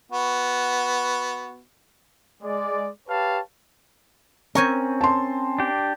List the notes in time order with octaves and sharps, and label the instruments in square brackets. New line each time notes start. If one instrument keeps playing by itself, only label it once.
[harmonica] B3 F#4
[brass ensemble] G#3 D5
G4 B4 C#5 F5 A5
[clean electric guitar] C4 C#4 [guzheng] A#4 C#5 G#5
[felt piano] A5 C6
[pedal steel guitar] D4 G4